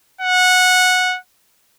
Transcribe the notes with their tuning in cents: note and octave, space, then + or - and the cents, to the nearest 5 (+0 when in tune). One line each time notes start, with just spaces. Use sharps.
F#5 -15